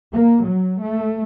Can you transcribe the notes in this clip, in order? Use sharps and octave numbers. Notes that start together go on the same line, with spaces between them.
A#3
F#3
A3